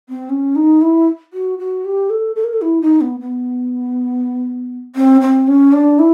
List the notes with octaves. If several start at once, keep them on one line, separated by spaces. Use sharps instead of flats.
C4
C#4
D#4
E4
F#4
F#4
G4
A4
A4
A#4
A4
E4
D#4
B3
B3
C4
C4
C#4
D4
E4